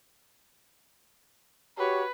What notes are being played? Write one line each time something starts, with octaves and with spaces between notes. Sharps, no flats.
F#4 G4 B4 C#5